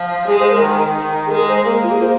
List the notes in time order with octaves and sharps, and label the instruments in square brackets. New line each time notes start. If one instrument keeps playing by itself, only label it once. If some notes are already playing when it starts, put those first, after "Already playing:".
Already playing: [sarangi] F3
[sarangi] G#3 [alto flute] G#4
[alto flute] C5
A#4
[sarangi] D#3
D#3
[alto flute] G#4
[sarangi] G#3 [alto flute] A#4
[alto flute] C5
[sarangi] A#3 [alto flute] A#4
[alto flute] F4
G#4
C5